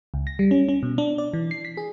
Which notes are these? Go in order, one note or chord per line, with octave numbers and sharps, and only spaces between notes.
C#2
A#6
G3
C#4
C#4
B2
D4
D5
E3
C7
B6
G#4